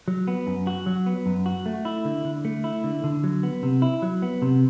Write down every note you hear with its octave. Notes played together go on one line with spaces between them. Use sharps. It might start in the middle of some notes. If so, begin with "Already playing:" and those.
F#3
B3
F#2
F#4
F#3
B3
F#2
F#4
A3
E4
D3
D3
A3
E4
D3
D3
F#3
B3
C3
E4
F#3
B3
C3